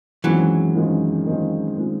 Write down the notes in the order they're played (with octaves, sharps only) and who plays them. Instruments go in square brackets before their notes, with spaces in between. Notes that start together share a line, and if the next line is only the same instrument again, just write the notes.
[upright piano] F#2 D#3 G#3 C4 F4 [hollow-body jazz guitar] E3 F#3
[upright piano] F#2 D#3 G#3 C4 F4
F#2 D#3 G#3 C4 F4
D#3 G#3 C4 F4